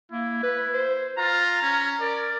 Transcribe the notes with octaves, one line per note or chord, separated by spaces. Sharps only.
A#3 E4
B4
C5
F4 A#5
C#4
A#4 D5